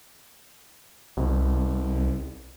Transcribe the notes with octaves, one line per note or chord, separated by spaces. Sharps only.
C2